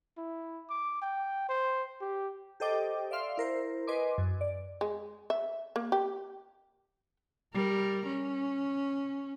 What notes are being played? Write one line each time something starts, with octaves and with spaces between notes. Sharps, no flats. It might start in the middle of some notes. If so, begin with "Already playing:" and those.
E4
D6
G5
C5
G4
G4 A4 C5 D#5 G5 D6
D5 E5 F5 C6 F6
E4 A#4 C5
B4 D#5 G#5 C6 D6
F#2
D5
G#3
E5
A#3
G4
G3 A#4
C#4